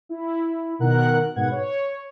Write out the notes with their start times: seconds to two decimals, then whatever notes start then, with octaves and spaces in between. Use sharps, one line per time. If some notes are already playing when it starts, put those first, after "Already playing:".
0.09 E4
0.79 B2 D#3 A#4 F#5 F#6
1.36 G#2 B2 B3 F#5 G#6
1.52 C#5